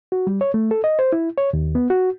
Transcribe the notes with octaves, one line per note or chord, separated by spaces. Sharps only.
F#4
G3
C#5
A3
A4
D#5
C5
E4
C#5
D#2
B3
F#4